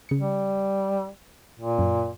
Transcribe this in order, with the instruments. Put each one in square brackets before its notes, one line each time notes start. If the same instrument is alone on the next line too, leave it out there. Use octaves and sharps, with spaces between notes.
[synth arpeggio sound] C#3 C#7
[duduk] G3
A#2
[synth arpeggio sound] F#2